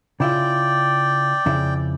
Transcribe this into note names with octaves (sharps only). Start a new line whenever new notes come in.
C#3 E4 F4 D5 G5
F2 C#3 E4